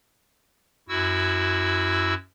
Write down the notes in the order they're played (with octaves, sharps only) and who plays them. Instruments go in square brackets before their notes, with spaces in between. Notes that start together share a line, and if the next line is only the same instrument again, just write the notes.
[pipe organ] F#2 E4 F#4 E6